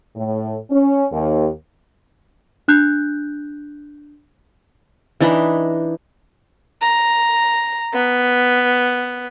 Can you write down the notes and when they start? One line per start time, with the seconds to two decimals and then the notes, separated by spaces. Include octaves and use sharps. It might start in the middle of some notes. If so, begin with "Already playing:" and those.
0.16 A2
0.70 C#4
1.12 D#2
2.68 D4 F#6 G6
5.20 E3 D4 D#4 B5
6.82 A#5
7.93 B3